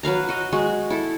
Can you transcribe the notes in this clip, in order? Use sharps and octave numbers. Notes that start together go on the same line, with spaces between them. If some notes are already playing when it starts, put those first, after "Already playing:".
F#3 B4 F5 A#5
F#4 D#5
G#3 F#4
E4 A4